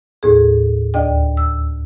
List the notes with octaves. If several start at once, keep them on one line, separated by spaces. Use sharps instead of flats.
D#2 A2 G#4
D2 D5 D#5 G5
E6